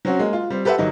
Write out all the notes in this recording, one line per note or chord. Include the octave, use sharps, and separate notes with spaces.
F#3 C4 C#4 F#4
G#3 A#3
F4
G3 C4
G4 A4 B4 C5 E5 F#5
G1 F#3 D#4